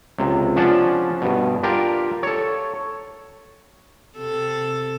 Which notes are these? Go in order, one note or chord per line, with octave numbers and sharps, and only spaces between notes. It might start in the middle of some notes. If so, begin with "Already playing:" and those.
C#2 C3
F3 C#4 D4 F4 F#5 A5
G2 B2
D4 F4 G4 A#4 G5
A4 C#5
C3 A4